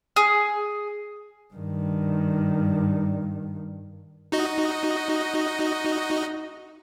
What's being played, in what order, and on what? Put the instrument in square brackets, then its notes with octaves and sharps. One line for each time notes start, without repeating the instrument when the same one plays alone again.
[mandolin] G#4
[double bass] G2 D#3
[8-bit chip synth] D#4 F#4 D#5